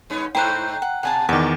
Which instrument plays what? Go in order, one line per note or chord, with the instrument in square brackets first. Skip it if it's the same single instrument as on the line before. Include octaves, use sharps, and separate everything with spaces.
[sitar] G2 B3 C#4
[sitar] G#2 A3 D#4 [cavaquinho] E4 C5 [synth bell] G5 A#5 F#6
[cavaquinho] F#5
[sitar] B2 [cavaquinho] F#5 G#5 A5
[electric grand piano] E2 D#3 [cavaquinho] D5 [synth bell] F#5 D6